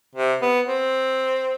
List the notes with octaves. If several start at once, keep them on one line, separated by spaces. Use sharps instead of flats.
C3
B3
C4